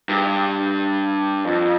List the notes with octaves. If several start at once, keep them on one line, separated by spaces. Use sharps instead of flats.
G2
F2